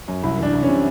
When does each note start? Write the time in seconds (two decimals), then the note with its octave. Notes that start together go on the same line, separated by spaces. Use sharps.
0.08 F#2
0.23 C2 E4
0.38 E3 D4
0.53 C2
0.63 C#4
0.68 C3